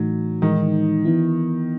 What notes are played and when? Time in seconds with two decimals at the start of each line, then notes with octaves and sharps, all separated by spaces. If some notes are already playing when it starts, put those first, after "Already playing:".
Already playing: A2 E3 F#3 A3 D#4
0.42 A2 D#3 E3 G#3 D#4
1.05 E3 B3 E4